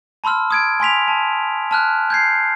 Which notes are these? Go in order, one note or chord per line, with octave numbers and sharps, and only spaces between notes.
A5 B5 C6 E6 F6
D#6 G#6 D7
G#5 C6 B6 F7
A5
A5 F6 F#6
G6 G#6 C7